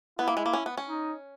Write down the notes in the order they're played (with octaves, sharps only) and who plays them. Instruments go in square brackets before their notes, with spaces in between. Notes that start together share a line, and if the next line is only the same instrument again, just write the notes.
[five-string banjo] B3 [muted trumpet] E4
[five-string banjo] A#3
G#3
A#3
C#4
B3
C#4
[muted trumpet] D#4